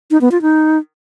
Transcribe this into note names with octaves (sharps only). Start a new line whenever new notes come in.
D#4
B3
F4
D#4